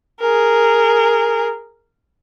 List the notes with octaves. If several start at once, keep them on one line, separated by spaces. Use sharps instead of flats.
G#4 A#4